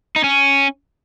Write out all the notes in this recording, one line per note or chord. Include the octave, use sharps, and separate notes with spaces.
D#4
C#4